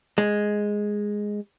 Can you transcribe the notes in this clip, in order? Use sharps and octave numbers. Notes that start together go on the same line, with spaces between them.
G#3